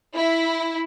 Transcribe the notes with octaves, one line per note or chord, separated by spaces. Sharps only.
E4